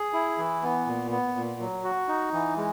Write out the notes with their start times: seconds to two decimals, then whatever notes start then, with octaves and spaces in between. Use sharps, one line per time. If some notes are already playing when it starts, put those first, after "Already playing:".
Already playing: G#4
0.13 E4
0.38 E3
0.63 B3
0.87 A#2
1.11 B3
1.36 A#2
1.60 F#3
1.84 F#4
2.08 D#4
2.33 E3
2.57 G#3